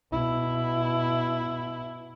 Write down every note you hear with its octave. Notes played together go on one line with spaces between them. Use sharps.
B2 E4